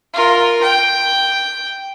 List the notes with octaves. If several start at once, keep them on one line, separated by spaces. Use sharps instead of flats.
F4 A#4
G5